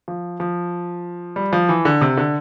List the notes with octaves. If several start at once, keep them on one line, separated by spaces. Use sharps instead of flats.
F3
F3
G3
F3
E3
D3
C3
D3